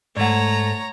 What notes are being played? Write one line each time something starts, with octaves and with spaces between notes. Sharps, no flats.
G#2 A3 C#5 D5 F#5 A#5